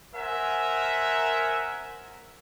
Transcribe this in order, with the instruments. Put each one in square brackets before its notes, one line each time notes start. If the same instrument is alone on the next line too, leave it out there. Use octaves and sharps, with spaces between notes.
[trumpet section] A#4 C5 E5 F#5 G#5